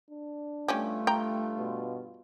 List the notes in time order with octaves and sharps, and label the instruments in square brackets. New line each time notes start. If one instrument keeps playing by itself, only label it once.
[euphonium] D4
[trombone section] G2 F4 [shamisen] G3 C#4 G4 [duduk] A3
[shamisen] G5 A#5
[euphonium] B2